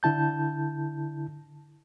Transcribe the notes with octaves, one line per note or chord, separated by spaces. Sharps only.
D3 E4 A5 G6